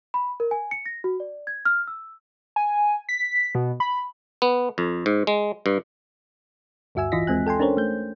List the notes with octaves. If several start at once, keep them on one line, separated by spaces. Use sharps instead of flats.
B5
A#4
G#5
C#7
A#6
F#4
D5
G#6
F6
E6
G#5
B6
B2
B5
B3
F2
G#2
G#3
G2
D2 G2 F#4 E5 G#5 E6
A1 E3 F4 D#5 A#6 B6
D#2 G#3 C4 G#5 F#6
A4 G5 G#5 C6
C#4 D4 A4 A#4 C5 C#5
A3 G6